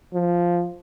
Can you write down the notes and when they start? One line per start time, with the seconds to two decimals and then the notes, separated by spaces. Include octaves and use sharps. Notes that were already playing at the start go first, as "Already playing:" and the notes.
0.14 F3